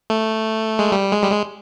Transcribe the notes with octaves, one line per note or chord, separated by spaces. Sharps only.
A3
G#3
G3
G#3
G3
G#3